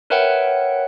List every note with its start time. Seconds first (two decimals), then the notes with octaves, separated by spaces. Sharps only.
0.10 A#4 B4 C#5 E5 F#5 G5